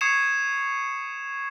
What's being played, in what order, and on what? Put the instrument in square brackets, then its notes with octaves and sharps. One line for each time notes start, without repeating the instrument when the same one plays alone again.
[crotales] C#6 D#6 G#6 C7 C#7 E7